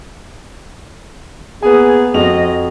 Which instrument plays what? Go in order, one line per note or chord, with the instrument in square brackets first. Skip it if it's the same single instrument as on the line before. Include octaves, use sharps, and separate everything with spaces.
[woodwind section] A#3 B3 G#4 [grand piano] B4 G#5
[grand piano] F2 F#4 F7 [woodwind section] F3 D#5